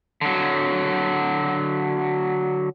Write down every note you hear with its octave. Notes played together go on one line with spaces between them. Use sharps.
D3 F#3